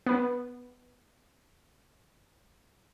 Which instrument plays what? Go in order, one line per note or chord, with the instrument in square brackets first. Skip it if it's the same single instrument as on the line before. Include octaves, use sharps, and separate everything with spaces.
[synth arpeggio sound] B3 B4